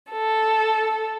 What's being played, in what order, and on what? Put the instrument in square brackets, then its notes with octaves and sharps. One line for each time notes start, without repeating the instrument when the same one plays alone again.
[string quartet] A4